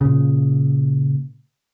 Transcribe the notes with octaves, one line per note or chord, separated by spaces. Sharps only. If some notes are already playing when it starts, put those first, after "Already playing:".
A#2 C#3